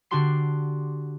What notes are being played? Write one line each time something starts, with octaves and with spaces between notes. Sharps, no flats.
D3 D4 F#4 G4 C6 C7